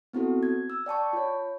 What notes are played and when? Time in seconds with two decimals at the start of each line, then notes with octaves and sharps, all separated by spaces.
0.13 B3 C4 E4 F#4 A4
0.43 G#6
0.70 E6
0.86 D5 G5 A5 C#6
1.13 F4 C#5